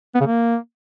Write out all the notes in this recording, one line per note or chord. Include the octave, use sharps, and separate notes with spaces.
B3
C#3
A#3